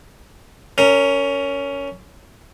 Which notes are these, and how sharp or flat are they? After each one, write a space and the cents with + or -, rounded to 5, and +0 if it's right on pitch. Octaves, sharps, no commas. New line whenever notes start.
C#4 +15 A#4 -15